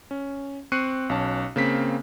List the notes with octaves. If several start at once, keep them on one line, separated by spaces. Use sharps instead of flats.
C#4
C4 C#6 F#6 C7 C#7 D#7
B1 C#4 A5
C#3 A#3 C4 B6